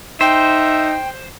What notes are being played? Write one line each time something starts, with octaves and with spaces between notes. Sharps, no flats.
D#4 C5 E5 G5